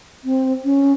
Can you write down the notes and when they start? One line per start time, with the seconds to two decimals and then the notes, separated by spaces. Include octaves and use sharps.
0.24 C4
0.65 C#4